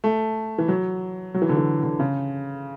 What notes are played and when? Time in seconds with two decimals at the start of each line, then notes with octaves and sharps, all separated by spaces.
0.04 A3
0.58 E3
0.68 F#3
1.34 F#3
1.42 E3
1.49 D3
1.57 E3
1.83 D3
2.00 C#3